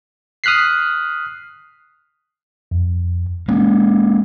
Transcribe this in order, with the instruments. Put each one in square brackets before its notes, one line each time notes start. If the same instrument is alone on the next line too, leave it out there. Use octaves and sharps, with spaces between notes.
[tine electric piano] D#6 F6 F#6 B6 C7
[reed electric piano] F2
[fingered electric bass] G#3 A#3 C#4